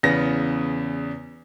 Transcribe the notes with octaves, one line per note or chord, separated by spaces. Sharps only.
E2 C#3 B3 A#6